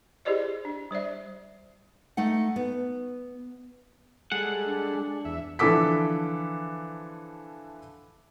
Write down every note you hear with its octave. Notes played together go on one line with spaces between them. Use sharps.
E4 G4 G#4 C5 D5 D#5
D4
G3 C5 D5 E5
A3 D#4 F#5
B3
G3 G#3 G#4 A4 F#5
D4
E2 E5
D3 E3 F3 A4 D6 B6